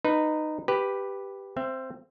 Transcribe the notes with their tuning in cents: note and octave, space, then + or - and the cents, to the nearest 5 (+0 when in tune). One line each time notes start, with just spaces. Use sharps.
D#4 -15 B4 +0
G4 +0 B4 +0
C4 +0 E5 +30